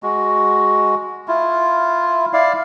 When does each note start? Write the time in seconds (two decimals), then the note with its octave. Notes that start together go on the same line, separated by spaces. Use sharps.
0.03 G#3 F#4
1.28 E4 F4
2.33 E4 D5 F5